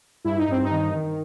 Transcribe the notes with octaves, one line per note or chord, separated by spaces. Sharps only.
G2 E4
D#4
G2 C4
D#4
D#3
D#3